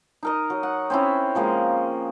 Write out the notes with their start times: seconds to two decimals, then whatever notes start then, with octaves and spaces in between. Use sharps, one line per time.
0.23 D#4 A#4 D#5
0.50 F#3
0.63 F#5
0.90 C4 C#4 E4
1.35 F3 G#3 A#3